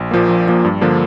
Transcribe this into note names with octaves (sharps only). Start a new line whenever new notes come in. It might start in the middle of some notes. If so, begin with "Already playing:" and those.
Already playing: A#1
A#2 F3 A#3
A#1
A#2 F3 A#3
G2
D3 F3 A#3 D4